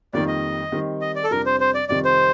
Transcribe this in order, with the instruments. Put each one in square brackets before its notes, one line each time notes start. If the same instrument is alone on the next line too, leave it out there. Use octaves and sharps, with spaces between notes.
[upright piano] F2 D#3 G3 A#3 D#4 [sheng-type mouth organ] D5
[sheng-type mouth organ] D#5
[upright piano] D#3 G3 C4 D#4
[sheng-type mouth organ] D#5
D5
A4
[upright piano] F2 C3 G3 D4 [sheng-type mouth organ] A#4
[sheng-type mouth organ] C5
C5
D5
[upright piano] F2 C3 D#3 G3 C4 [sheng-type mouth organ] D5
[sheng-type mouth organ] C5